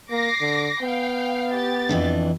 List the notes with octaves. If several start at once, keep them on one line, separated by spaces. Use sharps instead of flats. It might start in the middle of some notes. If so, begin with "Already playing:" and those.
A#3 D6 A#6 C7
D3
B3 F5 G5
G4 A6
F2 E3 D4